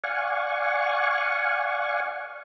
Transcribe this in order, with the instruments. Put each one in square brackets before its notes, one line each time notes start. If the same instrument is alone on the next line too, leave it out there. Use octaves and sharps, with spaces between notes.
[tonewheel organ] D5 F5 F#5 G#5 C#6